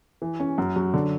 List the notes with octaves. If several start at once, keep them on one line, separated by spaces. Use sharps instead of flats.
E3
C#4
F#2
F#3
D3